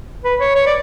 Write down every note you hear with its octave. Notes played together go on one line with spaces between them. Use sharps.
B4
C#5
C#5
D5